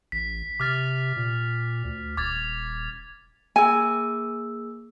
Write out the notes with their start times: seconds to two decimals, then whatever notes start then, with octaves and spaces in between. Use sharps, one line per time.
0.12 A1 B6
0.60 C3 D6 F6 A6
1.16 A#2
1.85 D2
2.17 D#1 D6 G#6 A6
3.56 A#3 G#4 G#5 E6